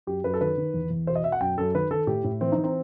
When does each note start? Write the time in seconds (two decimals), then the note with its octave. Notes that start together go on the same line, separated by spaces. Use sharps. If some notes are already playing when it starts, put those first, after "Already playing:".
0.07 F#2 G4
0.24 F#2 B4
0.34 A4
0.41 D#3 B4
0.58 D#3
0.74 E2
0.90 E2
1.07 B2 C5
1.15 D#5
1.24 B2 E5
1.32 F#5
1.41 F#2 G5
1.58 F#2 A4
1.75 D#3 B4
1.91 D#3 A4
2.07 A2 G4
2.24 A2
2.41 E3 C4
2.52 E3 D#4
2.64 C4